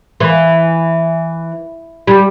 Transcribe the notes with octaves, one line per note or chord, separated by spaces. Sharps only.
E3
G3